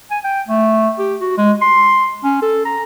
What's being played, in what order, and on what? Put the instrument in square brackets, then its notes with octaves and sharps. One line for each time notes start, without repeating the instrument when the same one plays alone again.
[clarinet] G#5
G5
A3
G4
F#4
G#3
C6
C#4
A4
A#5